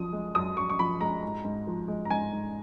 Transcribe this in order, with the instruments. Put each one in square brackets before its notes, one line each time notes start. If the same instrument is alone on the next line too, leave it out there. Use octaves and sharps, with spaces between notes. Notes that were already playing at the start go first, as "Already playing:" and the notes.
Already playing: [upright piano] F#2 F3 D#6
G#3
F#2 D#6
F#2 C#6
C#6
F3 B5
G#3 A#5
G#2
G#2
F3
G#3
A#5
G#2 G#5
G#2